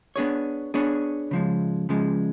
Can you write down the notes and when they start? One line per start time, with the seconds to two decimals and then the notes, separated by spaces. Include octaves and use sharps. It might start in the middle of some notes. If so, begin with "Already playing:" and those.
0.16 B3 D4 G#4 C#5
0.74 B3 D4 G#4 C#5
1.31 C#3 F3 G#3
1.89 C#3 F3 G#3